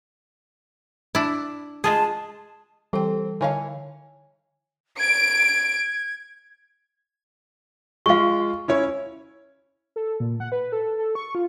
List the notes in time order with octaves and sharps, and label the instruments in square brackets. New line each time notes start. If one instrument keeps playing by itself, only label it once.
[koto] D4 E4
[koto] G#3 F4 G#4 [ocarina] A5
[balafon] E3 G5 [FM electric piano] G3 A4 [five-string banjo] C4
[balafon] D3 D#5 A5 [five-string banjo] E3 C#5 F5
[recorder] G#6 [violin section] D7
[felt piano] G#3 F4 [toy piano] F5 C#6
[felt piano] C#4 E4 C#5
[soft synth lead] A4
A#2
F#5
B4
A4
A4
C#6
F4